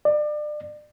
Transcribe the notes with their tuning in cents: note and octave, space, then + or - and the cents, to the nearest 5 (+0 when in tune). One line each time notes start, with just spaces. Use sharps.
D5 +30